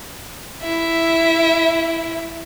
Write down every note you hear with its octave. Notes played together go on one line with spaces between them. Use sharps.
E4 E5